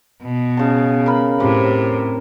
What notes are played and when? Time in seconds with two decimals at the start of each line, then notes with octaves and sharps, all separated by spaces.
0.23 B2
0.57 C#3 A5
1.06 A#4 B5
1.40 A2 C3